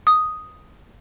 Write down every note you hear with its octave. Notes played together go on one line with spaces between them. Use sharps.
D#6